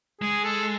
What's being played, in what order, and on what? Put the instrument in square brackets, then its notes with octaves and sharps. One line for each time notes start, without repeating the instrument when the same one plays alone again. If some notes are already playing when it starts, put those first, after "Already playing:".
[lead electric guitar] G#3 [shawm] G#4
[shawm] A4